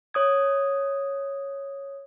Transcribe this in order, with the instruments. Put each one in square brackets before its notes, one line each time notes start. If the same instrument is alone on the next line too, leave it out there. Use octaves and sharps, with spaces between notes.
[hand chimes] C#5 D#6 G#6